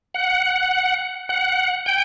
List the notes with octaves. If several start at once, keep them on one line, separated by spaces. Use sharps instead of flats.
F#5
F#5
G5